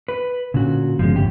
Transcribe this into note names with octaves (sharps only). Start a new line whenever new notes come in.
B4
A#2 D3 C#4 F#4
G1 C#3 F3 G#3
F#2 A2 G4